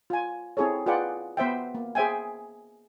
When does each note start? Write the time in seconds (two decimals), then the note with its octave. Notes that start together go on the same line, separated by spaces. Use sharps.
0.10 F4 G#5
0.57 C4 E4 G#4 A4 C#5
0.86 F4 G#4 B4 D5 F#5 G5
1.37 B3 C5 E5 G5
1.75 A#3
1.95 G#4 C5 E5 G5 G#5